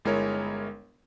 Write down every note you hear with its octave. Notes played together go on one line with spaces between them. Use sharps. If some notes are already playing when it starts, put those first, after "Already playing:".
G1 G#3 E4 A#4 C#5